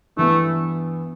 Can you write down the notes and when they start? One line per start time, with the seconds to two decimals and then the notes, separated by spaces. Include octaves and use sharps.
0.17 G2 E3 A3 B3